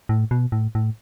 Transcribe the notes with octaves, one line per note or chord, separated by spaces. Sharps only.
A2
B2
A2
A2